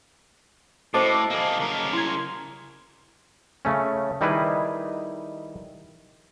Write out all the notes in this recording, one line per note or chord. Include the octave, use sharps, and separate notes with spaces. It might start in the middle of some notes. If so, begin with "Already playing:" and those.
A2 F#4 A4 C5 D#5 A5 D6
A#3 G#4
C#3 A#4
E4 C6 G#6
C#3 A3 C#4
D#3 G3 D#4 E4 G#4 B4